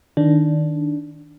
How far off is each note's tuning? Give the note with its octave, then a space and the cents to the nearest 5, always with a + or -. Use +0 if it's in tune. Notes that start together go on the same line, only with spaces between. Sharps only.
D#3 +0 D4 -10